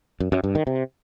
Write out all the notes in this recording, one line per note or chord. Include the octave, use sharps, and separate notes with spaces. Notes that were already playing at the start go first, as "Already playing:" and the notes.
F#2
F#2
G2
D#3
C3